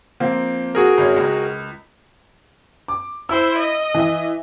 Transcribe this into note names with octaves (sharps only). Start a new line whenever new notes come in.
F3 A#3 C4
F#4 G#4 A#4
G#1 C#4
C#2
D6
E4 C5 E6
D#5
E3 E5